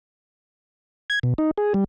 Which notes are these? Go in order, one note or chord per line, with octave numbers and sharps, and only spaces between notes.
G#6
B2
D#4
G#4
G3